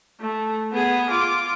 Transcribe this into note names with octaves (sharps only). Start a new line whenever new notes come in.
A3
B3 G#4
F4 D6